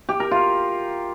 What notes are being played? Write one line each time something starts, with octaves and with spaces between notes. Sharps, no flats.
G4
A#4
F4